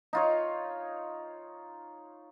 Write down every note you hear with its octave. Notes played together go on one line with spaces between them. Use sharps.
D#4 F4 C#5